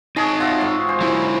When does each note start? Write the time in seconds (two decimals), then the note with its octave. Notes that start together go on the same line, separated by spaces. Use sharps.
0.16 D#4 G#4 C#5 D#5 A5
0.40 F4 F#4 E5
0.61 G#2 C#6
0.89 C5 G#5
1.01 F#3 E4